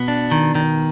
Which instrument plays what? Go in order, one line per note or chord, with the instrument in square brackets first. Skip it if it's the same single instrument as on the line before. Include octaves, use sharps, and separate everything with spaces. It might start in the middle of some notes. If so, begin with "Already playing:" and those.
Already playing: [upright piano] B2 [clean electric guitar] B3
[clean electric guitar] D4
D#3
D#3